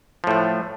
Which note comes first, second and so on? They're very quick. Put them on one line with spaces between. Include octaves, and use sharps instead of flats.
F3 A2 A3